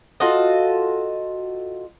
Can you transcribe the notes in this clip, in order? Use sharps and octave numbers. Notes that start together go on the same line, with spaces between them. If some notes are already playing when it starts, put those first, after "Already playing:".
F4 F#4 A4 D#5